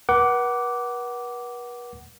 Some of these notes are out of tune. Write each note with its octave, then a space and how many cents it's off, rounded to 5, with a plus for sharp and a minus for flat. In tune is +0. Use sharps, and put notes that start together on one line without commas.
B4 -40 F#5 +15 D6 -10